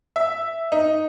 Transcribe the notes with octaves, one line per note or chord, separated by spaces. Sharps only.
E5
D#4